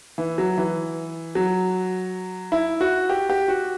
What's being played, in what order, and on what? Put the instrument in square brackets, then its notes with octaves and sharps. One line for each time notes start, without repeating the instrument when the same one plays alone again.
[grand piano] E3
F#3
E3
F#3
E4
F#4
G4
G4
F#4